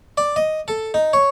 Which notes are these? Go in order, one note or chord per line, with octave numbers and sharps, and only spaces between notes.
D5
D#5
A4
D#4
C#5